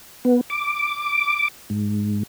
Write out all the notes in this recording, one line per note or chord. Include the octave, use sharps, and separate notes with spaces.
B3
D6
G#2